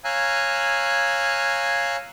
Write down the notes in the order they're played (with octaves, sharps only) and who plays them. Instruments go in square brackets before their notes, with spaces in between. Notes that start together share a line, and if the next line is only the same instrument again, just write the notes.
[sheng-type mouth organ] C#5 F5 G#5 A#5 E6 F#6